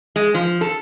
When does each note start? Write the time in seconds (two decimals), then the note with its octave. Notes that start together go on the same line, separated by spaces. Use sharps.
0.16 G#3
0.34 F3
0.61 A4